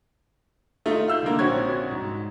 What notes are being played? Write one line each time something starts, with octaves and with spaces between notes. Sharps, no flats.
A3 D#4 F4
F5 E6 G6
D3 D#3 A#3
A#1 C4 C#4 F#4 C#6 G#6
G#2